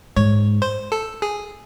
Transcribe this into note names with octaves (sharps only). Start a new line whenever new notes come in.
G#2 C#5
C5
A4
G#4